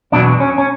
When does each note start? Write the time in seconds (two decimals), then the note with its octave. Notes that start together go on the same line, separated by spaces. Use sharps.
0.12 E2 B2 F#3 B3 D4
0.40 C#4
0.58 C#4